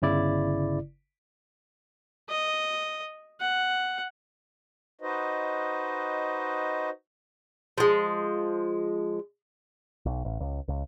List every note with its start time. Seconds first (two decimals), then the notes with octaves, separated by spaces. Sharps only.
0.02 G1 C#3 E4 D5
2.29 D#5
3.41 F#5
5.01 D#4 F#4 B4 C5 D#5
7.78 F3 G#3
10.06 B1
10.25 A1
10.40 C#2
10.68 C#2